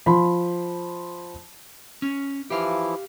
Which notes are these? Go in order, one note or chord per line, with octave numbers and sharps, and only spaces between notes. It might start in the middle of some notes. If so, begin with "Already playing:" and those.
F3 B5 C6
C#4
E3 F3 E4 G4 F5